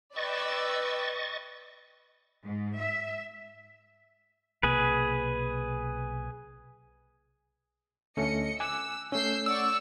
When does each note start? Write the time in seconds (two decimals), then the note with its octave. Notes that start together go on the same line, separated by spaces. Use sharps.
0.16 B4 D5 D#5 G5 C#6 E6 A6
2.45 G#2
2.77 E5
4.63 B1 C3 A#3 G#4 B4
8.17 D2 A3 C#4 D#5 C#7
8.60 G#5 D6 E6 F#6
9.12 A3 C#4 E6 G6 C7
9.46 D5 F#5 C#6 E6